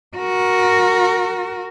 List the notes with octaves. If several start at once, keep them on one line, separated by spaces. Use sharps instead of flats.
F#4 A#4